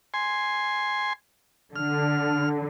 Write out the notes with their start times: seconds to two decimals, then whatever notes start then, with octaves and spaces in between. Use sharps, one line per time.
0.14 G#5 C6
1.76 D3 F6